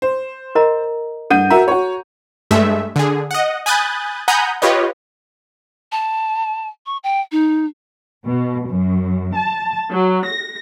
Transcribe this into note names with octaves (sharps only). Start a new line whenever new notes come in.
C5
A#4 D#5 A#5
G2 A4 F#5 G6 D#7
F#4 A#4 E5 A#5
F#4 C#5
G2 G#3 A3 E5
D3 G#4
D#5 F#5
G#5 B5 D#6 F#6 G6 A6
F#5 G#5 A#5 B5 D#6 G6
F4 G4 B4 C#5 D#5
A5
C#6
G5
D#4
B2
F#2
A5
F#3
A#6